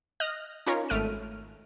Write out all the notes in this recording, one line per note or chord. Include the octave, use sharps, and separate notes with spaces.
D#5 F6 F#6 A#6
C#4 D#4 F4 A#4 C#5
G#1 A3 F6 D7 D#7